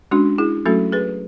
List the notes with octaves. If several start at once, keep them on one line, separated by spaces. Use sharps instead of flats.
G#3 C#4 D4 F#4
E4 G#4
F#3 A3 C#4 F#4 A4
G#4 B4